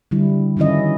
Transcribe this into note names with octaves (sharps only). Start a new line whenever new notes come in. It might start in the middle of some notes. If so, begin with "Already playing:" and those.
D3 G3 E4
D#3 F3 C#4 E4 D#5